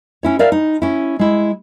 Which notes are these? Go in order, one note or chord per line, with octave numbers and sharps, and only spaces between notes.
C#4 E4 C#5
A#4 D5 E5 F5
D#4
C#4 E4
G#3 E4